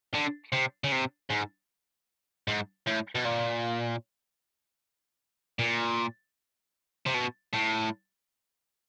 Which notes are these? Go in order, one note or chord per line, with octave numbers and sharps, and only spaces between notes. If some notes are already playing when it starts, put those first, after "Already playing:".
D3
C3
C#3
C3
G#2
G#2
A2
B2
A#2
A#2
C3
B2
A2